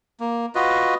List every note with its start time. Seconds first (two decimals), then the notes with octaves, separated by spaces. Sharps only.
0.20 A#3
0.55 F4 F#4 B4 D#5